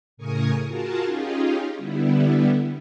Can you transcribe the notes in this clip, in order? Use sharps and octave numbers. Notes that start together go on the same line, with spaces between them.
A2 C#3 A#4 G#5 C#6 D#6
F4 F#4 G#4 A#4 A5
C#4 D#4 F4 G4 G#4
D3 G3 B3 E4